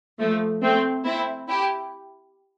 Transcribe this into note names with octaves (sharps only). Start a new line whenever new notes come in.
F3 A3
A3 C4
C4 E4
E4 G4